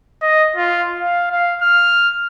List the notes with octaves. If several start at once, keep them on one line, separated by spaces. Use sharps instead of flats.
D#5
F4
F5
F5
F6